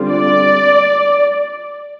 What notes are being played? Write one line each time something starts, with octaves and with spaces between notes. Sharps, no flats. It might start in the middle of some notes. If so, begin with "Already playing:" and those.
Already playing: D3 G3 C4 F4
D5